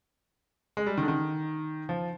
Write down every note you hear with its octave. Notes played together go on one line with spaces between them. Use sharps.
G#3
G3
D#3
D3
D#3
F3